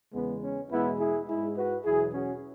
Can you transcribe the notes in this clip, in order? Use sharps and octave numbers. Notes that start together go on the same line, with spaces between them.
E2 C#3 G#3 B3
C#4
E2 B2 G#3 B3 E4
E4 G#4
G#2 G#3 E4 G#4
F#4 B4
E2 B2 F#3 E4 G#4
C#4 F#4